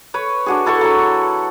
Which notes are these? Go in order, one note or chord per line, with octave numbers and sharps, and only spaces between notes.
B4 C#5
D4 F#4 G#4
E4 A4 F#5 C#6
F#3 B5